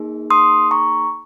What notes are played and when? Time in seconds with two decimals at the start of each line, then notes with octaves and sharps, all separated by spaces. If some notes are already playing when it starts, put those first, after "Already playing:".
Already playing: A#3 D#4 G#4
0.30 C6 D#6
0.71 A#5 C#6